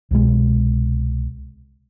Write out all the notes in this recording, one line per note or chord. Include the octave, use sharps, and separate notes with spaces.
C2 B2 G#3